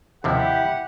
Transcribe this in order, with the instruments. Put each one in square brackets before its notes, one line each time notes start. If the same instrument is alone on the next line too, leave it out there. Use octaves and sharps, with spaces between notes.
[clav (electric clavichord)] D#2 C3 F3 [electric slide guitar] E4 [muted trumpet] G4 [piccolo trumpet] F#5